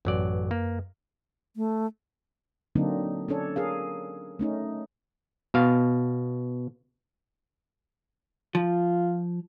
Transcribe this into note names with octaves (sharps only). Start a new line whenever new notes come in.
A1 F#2 F#3 B4 D5
A#3
A3
D3 F#3 A#3 C4 D4 D#4
C#4 D4 A4 C#5
G#4 A#4 F5
A3 C#4 D#4
B2 F5
F3 F4